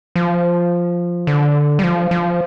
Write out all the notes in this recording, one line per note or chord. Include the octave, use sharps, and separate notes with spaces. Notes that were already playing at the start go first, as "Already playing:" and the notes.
F3
D3
G3
F3
F3